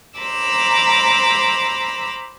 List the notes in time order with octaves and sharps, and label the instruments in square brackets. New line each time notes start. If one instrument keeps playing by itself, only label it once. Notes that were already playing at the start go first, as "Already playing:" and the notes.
[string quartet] C5 A#5 B5 D6 E6